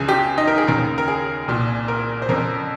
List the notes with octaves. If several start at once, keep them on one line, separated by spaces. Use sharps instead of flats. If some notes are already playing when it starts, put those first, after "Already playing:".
Already playing: C#2 C#3 G#4 G#5
G4 G5
D#4 D#5
A#4
G#4
D#2 C#3 A#4
A#4
G#4
C2 A#2
A#4
C5
F2 C#3 A#4